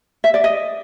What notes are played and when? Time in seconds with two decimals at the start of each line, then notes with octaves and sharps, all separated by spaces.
0.24 E5
0.34 D5
0.44 D#5